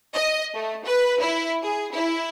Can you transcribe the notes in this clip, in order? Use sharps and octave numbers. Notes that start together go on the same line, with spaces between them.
D#5
A3
B4
E4
G#4
E4